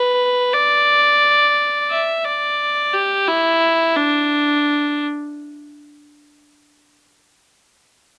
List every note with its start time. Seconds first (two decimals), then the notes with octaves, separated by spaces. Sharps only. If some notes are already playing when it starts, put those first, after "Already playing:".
Already playing: B4
0.54 D5
1.90 E5
2.24 D5
2.93 G4
3.28 E4
3.96 D4